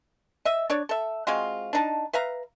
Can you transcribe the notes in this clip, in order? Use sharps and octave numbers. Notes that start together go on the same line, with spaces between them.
D#5 E5
D4 C#5 D5
A4 E5
G#3 C4 F4 F#4
D4 D#4 A5
B4 E5 F5 A#5